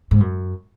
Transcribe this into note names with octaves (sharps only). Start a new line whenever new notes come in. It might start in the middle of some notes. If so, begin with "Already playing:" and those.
G#2
F#2